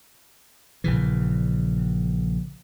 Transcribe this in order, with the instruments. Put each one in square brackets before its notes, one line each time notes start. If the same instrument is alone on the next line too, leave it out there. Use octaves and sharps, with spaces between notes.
[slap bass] A#1 C#3 E3